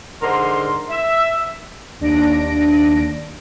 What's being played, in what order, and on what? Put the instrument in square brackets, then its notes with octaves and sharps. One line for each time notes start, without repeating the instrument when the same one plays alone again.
[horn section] G#2 D3 A#4 C6
E5
[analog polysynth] D#2 D4 A#6 D7